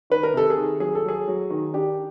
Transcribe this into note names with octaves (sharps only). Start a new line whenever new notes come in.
D#3 B4
A#4
C3 A4
G#4
D#3
F#3 G#4
A4
F#3 G#4
F#3
D#3
D4 G4